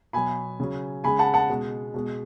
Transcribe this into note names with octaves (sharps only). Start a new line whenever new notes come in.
B2 F#3 G#5 B5
C#3 F#3
C#3 G#3 G#5 B5
F#5 A5
F#5 A5
B2 G#3
B2 G#3